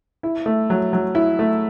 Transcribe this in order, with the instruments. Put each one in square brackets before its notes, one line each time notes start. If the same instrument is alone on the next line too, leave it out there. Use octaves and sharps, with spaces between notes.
[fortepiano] E4
A3
F#3
F#3
E4
A3